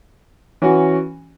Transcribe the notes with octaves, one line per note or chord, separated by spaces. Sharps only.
E3 C#4 F#4